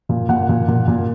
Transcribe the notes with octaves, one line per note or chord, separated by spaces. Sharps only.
A#2
A#2 F#5
A#2
A#2
A#2